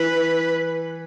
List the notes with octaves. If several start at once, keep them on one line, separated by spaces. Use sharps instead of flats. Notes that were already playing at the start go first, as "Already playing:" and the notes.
Already playing: E3 B4